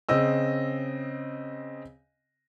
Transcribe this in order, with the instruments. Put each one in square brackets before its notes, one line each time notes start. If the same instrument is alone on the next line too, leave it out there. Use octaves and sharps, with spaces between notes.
[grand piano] C#3 C4 D#5 E6